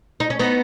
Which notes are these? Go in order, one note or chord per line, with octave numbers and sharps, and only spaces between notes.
D#4
C#4
B3 D#4